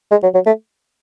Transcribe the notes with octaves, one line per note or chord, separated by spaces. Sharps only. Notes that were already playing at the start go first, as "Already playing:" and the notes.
G#3
F#3
F#3
A3